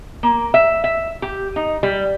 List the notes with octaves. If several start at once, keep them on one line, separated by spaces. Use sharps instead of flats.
A#3
E5
E5
G4
D#4
G3